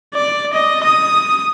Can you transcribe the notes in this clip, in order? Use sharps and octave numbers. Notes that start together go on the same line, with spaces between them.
D5
D#5
D#6